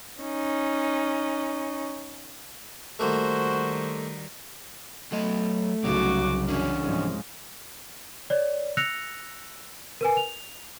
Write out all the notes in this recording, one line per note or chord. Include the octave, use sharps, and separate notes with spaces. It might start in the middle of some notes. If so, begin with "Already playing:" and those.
C#4 D#4
D#3 G3 A3 A#3 F#4 C5
F#3 A3 D#5
C2 C#3 F#3 D#4 F#4 D6
F#2 E3 C#4 D4
C2 G#2 F3 G#3
C#5 D5
E6 F#6 A#6 C#7 F7
A#4 B4 G#5
F7